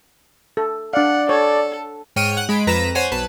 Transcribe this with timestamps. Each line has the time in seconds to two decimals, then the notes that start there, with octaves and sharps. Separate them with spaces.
0.57 A4
0.93 D4 D5 F5 F#5
1.29 A4 C#5
2.16 G#2 C#5 G5 F6 C#7 D#7
2.37 F#5 F#6
2.49 G#3 B5 D7
2.67 F2 B4 A#5 A#6 B6 E7
2.95 C5 C#5 F#5 G#5
3.11 B1 B4 A5